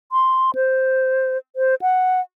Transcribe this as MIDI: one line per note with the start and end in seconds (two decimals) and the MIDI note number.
0.12 0.51 84
0.55 1.38 72
1.56 1.75 72
1.82 2.21 78